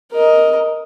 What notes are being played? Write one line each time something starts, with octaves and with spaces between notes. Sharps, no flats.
A#4 D#5